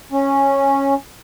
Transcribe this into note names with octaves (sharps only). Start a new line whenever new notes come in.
C#4